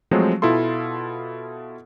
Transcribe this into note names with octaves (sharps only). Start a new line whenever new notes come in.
F3 F#3 G#3 A3 C4
B2 E4 F4 A4 C6